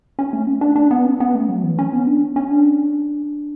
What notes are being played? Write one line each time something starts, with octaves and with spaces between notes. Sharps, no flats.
C#4
A3
C#4
D4
D4
B3
C#4
B3
A3
F#3
E3
C#4
B3
D4
C#4
C#4
D4